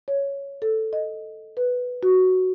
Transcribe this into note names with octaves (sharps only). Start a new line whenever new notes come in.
C#5
A4
D#5
B4
F#4